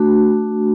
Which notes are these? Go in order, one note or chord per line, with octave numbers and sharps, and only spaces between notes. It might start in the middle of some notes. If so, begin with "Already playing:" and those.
Already playing: A3 D4 F#4